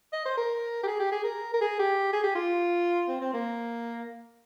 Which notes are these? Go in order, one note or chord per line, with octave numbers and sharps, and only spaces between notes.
D#5
C5
A#4
G4
G#4
G4
G#4
A#4
A#4
G#4
G4
G#4
G4
F4
C4
C4
A#3